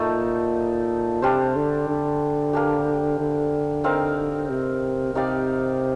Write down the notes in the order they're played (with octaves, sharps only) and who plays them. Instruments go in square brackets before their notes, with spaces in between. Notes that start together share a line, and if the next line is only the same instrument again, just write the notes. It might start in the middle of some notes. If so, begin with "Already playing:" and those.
Already playing: [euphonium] A#2 [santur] A3 D#4 A4 D#5
[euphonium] C3 [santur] G3 D4 G4 C5
[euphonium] D3
D3
[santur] A#3 D4 G4
[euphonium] D3
[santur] C4 D#4 A#4 F5
[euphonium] C3
[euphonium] C3 [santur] D#4 G4 D5 F5